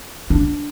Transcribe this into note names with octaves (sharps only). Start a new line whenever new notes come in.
D4